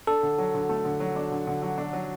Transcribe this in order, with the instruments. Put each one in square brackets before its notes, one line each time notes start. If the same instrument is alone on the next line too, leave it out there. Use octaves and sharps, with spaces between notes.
[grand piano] D4 [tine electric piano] A4
[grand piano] D3
F#3
D3
A3
D3
F#3
D4
D3
D3
F#3
D4
F#3